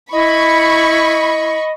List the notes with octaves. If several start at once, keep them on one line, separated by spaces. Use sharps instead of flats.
E4 D#5 B5 C#6